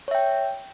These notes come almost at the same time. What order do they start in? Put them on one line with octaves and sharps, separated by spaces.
C#5 E5 G5